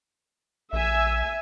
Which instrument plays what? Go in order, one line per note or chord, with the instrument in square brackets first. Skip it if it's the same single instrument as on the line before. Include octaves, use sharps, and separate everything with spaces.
[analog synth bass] A#1 [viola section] E5 G#5